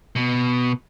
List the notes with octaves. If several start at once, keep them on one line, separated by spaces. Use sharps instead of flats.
B2